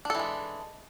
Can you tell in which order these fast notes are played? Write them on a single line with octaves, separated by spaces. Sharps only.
D4 A4 E3 G#3